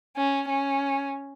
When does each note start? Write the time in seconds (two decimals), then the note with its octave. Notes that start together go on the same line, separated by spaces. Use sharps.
0.16 C#4
0.49 C#4